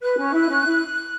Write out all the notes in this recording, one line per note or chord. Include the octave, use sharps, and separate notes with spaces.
B4 F#6
C#4
E4
C#4
E4